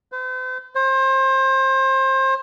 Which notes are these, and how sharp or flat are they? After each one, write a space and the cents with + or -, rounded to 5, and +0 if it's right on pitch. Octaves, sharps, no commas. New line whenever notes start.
C5 -45
C5 +30